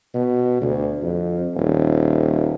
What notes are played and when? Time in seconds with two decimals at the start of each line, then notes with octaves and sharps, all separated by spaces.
0.14 B2
0.61 D2
1.02 F2
1.55 D#1